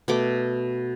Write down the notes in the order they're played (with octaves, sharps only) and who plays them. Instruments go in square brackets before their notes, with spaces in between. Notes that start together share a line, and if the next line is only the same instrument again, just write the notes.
[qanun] B2 A3 D6